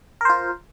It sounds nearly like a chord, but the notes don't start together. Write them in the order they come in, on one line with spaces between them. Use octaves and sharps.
A#4 C5 F4